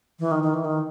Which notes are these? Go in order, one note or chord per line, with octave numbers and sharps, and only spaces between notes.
E3
D#3
D#3
E3
D#3